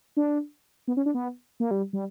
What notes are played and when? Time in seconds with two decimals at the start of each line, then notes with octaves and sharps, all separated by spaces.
0.17 D4
0.88 B3
0.97 C#4
1.06 D4
1.14 B3
1.60 A#3
1.71 G3
1.93 G3